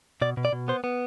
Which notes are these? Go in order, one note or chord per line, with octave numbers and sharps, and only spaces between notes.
B2 D5
B2
D5
B2
B3 C5
B3